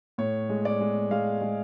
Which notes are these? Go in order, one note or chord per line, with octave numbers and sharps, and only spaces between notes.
A2 C#5
G#3
D5
G#3
G#3 F5
G#3